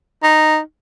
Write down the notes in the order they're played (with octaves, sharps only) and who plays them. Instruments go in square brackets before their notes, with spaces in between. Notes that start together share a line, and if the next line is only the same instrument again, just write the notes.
[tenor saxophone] D#4